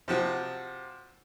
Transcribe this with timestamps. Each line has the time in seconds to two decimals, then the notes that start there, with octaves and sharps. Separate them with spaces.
0.08 C3 F3 F#4